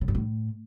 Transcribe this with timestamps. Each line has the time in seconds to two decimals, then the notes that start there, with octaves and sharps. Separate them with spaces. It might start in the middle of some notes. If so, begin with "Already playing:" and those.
0.01 C#3
0.08 G2
0.15 A2